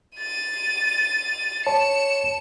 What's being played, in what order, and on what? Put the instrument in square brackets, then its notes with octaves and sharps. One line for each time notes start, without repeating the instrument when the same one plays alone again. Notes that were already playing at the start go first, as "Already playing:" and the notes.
[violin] A6 D#7
[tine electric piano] C#5 A5 [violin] C#7 E7